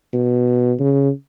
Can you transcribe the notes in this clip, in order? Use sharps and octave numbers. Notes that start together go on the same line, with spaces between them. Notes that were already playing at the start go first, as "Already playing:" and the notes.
B2
C#3